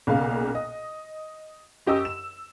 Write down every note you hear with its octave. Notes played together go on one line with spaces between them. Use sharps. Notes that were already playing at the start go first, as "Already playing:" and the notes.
B1 A#2 C#3 F5
D#5
F#2 G4 D#5 C#6 E6
E7